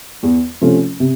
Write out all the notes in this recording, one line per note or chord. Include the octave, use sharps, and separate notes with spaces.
E2
C3 F3 A3 C#4
C3